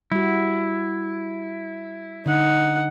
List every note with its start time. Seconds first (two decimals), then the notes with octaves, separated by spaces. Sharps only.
0.12 G3 E4 F#4
2.26 D3 D#4 F#5